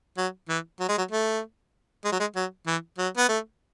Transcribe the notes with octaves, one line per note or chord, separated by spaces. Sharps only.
F#3
E3
F#3
G#3
F#3
A3
G#3
F#3
G#3
F#3
E3
F#3
B3
A3